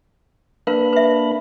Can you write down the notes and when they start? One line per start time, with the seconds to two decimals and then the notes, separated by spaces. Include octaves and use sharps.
0.67 A#3 D4 A#4 B4 F5 B5
0.93 B4 E5